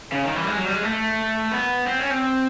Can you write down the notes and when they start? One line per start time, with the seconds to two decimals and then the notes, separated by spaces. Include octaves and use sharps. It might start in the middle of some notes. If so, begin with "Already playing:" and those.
0.12 C#3
0.24 D#3
0.35 E3
0.42 G3
0.47 G#3
0.57 F#3
0.65 G3
0.74 G#3
0.83 A3
1.52 B3
1.87 C4
1.99 C#4
2.10 C4